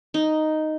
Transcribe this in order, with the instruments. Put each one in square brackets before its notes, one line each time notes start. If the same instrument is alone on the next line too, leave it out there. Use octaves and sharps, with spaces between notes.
[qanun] D#4